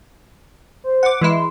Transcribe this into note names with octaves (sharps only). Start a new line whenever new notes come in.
C5
F#5 D6
E3 G#3 E4 C6